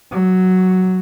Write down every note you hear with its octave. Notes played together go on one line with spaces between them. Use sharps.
F#3